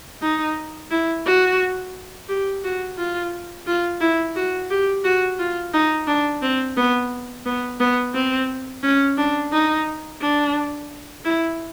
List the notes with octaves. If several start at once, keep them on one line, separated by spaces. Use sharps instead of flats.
D#4
E4
F#4
G4
F#4
F4
F4
E4
F#4
G4
F#4
F4
D#4
D4
C4
B3
B3
B3
C4
C#4
D4
D#4
D4
E4